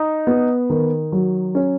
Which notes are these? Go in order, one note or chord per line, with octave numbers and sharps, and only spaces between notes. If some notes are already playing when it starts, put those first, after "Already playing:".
Already playing: D#4
B3
D#3
F#3
C#4